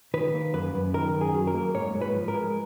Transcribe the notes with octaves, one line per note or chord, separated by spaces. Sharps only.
D#3 B4
A#3
F#2 B4
F#2
D#3 A#4
F#2
G#4
F#3
A#4
A#3
G#2 C#5
G#2
B4
F3
A#4
G#3